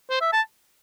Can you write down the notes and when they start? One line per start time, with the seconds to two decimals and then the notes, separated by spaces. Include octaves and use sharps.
0.10 C5
0.21 E5
0.32 A5